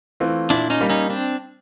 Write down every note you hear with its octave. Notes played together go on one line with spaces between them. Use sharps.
E3 A3 C4 F4
A#2 D4 E4
C#4 D#4
G3 A#3
C#4 D#4
C4 D4